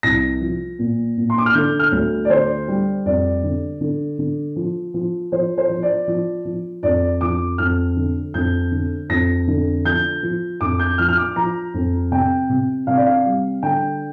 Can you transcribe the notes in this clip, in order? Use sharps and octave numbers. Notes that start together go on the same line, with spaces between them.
C2 A#6
F3
A#2
A#2
C6
D6
F6
D3 G6
F6
D2
D5
D3 C5
G3
F2 D5
D3
D3
D3
F3
F3
F3 C5
C5
F3
D5
F3
F3
F2 D5
F3 D6
F2 F6
D3
F2 G6
D3
F2 A#6
D3
F3 G6
F3
F2 D6
G6
F3 F6
F6
D6
F3 A#5
F2
C3 G5
C3
C3 F5
D5
F5
G3
D3 G5